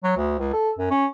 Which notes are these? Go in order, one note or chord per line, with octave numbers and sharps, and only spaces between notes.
F#3
D2
C#2
A4
F#2
C#4